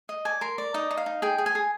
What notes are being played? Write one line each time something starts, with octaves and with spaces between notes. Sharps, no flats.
D#5
D5 G#5
A#4 C6
D5
D#4 D#5
D#4
F5
D#4
G#4 G5
G#4
G#5
G#4